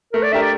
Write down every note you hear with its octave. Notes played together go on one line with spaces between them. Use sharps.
A3 A#4
D5
D4 G4 A#4 E5
D5